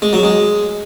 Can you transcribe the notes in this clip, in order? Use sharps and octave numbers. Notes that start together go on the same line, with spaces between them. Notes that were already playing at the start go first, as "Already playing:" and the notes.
G#3
F#3
G#3